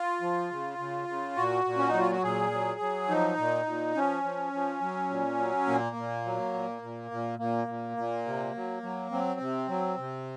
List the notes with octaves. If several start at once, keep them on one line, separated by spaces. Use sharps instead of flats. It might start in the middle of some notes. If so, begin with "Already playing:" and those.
Already playing: F4
F3
C#3
C#3
C#3
A#2 F#4
A#2
C#4
D#4
F#3
F4
F#4
A#2 G#4
F#3
F#3
F3 D#4
A#2
A#2
F3 C#4
F3
F3
F#3
A#2
F#3
A#2 A#3
A#2
F#3
A#2
A#2
A#2
A#2 A#3
A#2
A#2
C3
F#3
F#3
F#3 C4
C3
F#3
C3